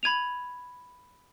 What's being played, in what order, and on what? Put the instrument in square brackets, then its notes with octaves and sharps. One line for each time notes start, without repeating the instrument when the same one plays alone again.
[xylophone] B5 G#6 D#7 F7